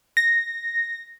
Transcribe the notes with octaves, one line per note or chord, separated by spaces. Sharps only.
A#6